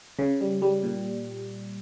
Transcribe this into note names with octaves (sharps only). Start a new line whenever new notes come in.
C#3
G3
G3
A#2